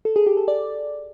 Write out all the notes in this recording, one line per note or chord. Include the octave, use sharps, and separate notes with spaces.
A4
G#4
G4
A4
D5